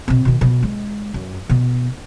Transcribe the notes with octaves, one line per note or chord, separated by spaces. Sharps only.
B2 C4
B2 D#3
B2 F3
G#3
F#2
B2 B3